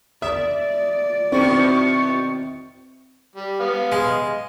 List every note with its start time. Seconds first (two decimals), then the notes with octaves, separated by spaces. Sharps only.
0.22 D5 E5 D#6
1.32 B2 D#3 C4 E4 C#6
3.36 G3
3.60 B3 F5
3.92 G#3